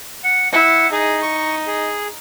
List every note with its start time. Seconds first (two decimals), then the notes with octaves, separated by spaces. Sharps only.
0.24 F#5
0.52 E4 F#5
0.92 D#4 G#4
1.22 C#6
1.67 G#4